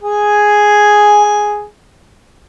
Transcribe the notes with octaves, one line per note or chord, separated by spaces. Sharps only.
G#4 G#5